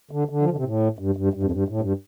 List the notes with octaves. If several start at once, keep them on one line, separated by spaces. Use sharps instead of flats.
D3
D3
F3
D3
C3
A2
G2
G2
G2
F2
G2
A2
G2